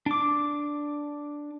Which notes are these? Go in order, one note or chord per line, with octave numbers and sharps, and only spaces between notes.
D4 D6